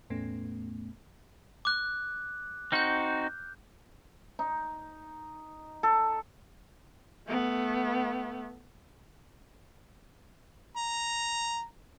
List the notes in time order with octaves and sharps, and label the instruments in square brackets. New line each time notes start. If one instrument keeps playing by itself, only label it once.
[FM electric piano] E2 A2 A3 B3 C#4
[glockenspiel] D6 F#6
[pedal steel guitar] C4 D#4 F#4 [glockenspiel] F6 G6
[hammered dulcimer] D#4
A4
[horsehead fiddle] A3 B3
[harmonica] A#5